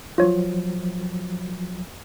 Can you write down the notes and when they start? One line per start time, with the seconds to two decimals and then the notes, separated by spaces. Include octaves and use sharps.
0.18 F3 F#3 F4 C#5